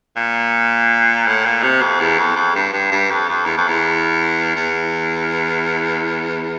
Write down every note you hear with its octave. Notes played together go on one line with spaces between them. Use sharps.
A#2
A2
A#2
C3
F2
E2
F2
F2
G2
G2
G2
F2
F2
E2
F2
E2
E2